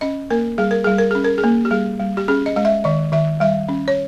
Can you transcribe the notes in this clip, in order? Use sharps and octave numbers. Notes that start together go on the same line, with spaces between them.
C#4 D#5
A#3 A#4
G3 G#4
A#4
G3 G#4
A#4
C#4 G#4
A#4
G#4
A#3
G4
G3 G#4
G3
G4
C#4 G#4
D#5
G#3 D#5
E5
D#3 D#5
D#3 E5
G3 E5
C#4
C#5